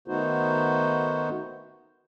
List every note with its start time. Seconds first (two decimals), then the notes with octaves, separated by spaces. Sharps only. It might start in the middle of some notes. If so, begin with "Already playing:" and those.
0.08 D#3 A3 B3 D#4 F#4 C5